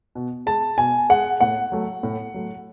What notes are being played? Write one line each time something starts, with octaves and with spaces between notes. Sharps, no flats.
B2
G#3 A5
B2 G#5
G#3 F#5
A2 F#5
F#3 A3
A2
F#3 A3